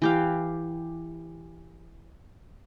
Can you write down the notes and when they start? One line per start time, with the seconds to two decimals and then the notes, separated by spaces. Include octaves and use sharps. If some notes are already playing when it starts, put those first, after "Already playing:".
0.02 E3 G4 F5